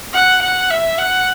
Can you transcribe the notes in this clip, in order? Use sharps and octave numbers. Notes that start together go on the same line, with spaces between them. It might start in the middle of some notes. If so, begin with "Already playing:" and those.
F#5
F#5
E5
F#5